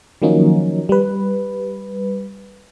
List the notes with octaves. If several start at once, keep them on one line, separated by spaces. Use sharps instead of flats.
D#3 F3 F#3 A#3 C#4 D#4
G3 B4